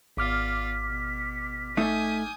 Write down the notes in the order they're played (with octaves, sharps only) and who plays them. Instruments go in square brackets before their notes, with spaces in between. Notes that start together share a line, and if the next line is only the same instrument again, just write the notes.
[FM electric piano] G#1 D6 F6 [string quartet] B3 F4 D5 [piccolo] B6
[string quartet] B2
[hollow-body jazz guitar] A3 D#4 E5 [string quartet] G#5 D#6 G6